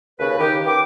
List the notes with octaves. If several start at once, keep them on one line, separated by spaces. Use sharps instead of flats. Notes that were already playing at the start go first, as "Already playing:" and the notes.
D#2 C#3 B4
D#3 G4
B4 G5 D6